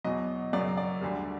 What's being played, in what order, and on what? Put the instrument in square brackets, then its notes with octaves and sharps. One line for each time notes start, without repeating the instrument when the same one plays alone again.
[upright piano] E2 B2 F#3 D#5
F#2 C#3 F#3 D5
D5
D2 D3 G3